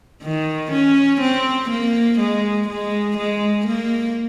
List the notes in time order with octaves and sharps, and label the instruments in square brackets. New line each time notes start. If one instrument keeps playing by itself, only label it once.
[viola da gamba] D#3
C#4
C4
A#3
G#3
G#3
G#3
A#3